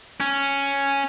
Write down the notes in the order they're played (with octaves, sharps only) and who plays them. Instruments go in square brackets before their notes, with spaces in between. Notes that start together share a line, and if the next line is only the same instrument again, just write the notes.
[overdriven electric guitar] C#4